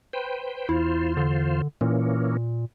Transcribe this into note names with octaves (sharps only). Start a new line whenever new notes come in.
B4 C5 G5
E2 E4 F4 C5
D3
A#2 E3 A#3 C#4